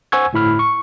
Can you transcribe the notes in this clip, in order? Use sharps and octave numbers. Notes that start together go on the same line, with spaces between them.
C5 F#5 G#5 C#6 E6 G#6
G1 A2 E4 B5 F6
C#6